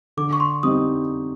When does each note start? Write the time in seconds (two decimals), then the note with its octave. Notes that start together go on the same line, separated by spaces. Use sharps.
0.17 D3 D6
0.33 C#6
0.40 C6
0.63 G3 C4 D#4 D#6